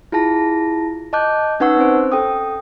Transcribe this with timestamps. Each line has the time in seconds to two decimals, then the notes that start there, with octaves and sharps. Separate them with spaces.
0.12 E4 F4 G#4 A5 A#6
1.13 D#5 A5 D6 F#6 G6
1.60 C#4 D#4 B4 F#5 C#6 E6
1.77 C4 C#4 C5
2.12 A4 G5 D#6